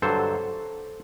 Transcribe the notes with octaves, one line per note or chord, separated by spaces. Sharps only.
G2 D3 F#3 A4 C5